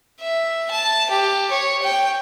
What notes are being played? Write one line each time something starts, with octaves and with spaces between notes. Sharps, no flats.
E5
A5
G4
C#5
G5